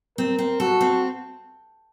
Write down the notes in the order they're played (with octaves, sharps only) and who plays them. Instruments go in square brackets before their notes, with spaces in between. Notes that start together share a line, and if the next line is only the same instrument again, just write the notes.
[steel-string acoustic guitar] C4 [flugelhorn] A#4
[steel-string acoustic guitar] C4
[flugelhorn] F#4 [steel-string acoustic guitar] A4
[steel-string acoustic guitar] C4